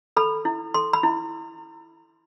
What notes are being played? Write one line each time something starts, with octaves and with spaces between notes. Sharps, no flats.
A4 B5
E4
A4 C6
B5
E4